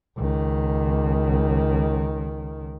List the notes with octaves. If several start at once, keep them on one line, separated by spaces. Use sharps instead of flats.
C#2 D#3